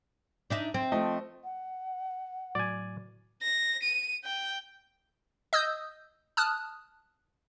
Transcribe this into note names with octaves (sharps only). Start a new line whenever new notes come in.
D4 D#4 E5
C4
F3 A3 D#5
F#5
A2 F#3 D5 G#5
A#6
D#7
G5
D#5 D#6 E6 G6
A5 D#6 F6 F#6